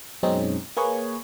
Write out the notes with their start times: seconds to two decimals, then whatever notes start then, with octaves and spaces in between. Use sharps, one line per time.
0.23 F#2 B2 G#3 C4 C#4 D#4
0.77 A#3 G#4 B4 C#5 G#5